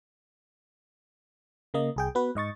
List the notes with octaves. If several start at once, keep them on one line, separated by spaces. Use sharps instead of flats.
C#3 A#3 D#5
C2 G#4 G5
B3 F#4 B4
G#2 D#5 C#6 A6